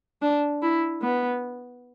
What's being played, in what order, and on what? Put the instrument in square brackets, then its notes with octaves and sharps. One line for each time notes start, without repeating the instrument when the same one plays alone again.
[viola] D4
E4
B3